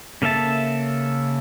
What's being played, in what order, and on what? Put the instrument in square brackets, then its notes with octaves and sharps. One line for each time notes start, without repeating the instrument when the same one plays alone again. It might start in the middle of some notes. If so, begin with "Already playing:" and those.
[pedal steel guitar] C#3 A#3 A4 E5 A5